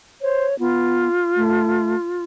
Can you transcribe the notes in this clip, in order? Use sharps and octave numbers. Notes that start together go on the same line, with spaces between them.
C5 C#5
B3 F4
A3